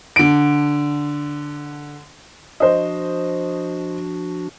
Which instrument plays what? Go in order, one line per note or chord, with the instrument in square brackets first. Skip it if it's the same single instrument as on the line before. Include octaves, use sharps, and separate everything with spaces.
[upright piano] D3 D7
[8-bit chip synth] F3 D4 F#4 [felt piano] C5 D#5